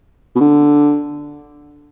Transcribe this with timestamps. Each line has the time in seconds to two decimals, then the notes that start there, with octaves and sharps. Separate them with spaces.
0.36 B2
0.41 D3